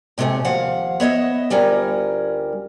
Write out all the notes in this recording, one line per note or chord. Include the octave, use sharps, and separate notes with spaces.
A2 C3 G#3 A3 C#4
D#2 F3 F5 F#5
B3 C#5 D#5 E5
D2 G3 C#4 F4 A#4